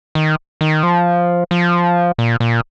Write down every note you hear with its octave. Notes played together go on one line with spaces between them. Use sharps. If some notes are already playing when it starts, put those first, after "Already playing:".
D#3
D#3
F3
F3
A#2
A#2